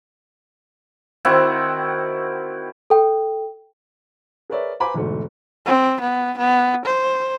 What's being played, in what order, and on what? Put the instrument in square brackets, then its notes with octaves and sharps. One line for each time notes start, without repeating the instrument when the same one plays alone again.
[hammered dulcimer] D#3 C4 E4 F#4
[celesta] A4 G5
[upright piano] G#4 A#4 B4 C#5 D5 E5
B4 C5 G#5 A#5 B5 D6
E1 D2 G#2 A3
[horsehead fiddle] C4
B3
B3
C5